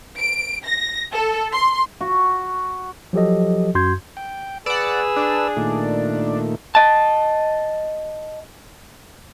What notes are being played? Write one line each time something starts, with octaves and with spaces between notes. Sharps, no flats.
D7
A#6
A4
C6
F#4
F3 F#3 G4 A4 D#5
F#2 F#4 C6 G6 G#6
G5
G#4 B4 D5 F#5 E6
D4
A#2 D#3 A3
D#5 A5